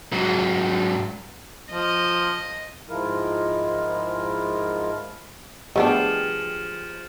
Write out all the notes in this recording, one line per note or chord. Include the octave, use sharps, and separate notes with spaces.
G#2 F#3
F3 D#5
G#2 F3 G#3 E4 F4 A#4
F3 A3 B3 D4 G4 G#4 D#5 F#5